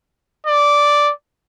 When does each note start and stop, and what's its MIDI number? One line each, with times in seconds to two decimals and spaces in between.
0.47 1.12 74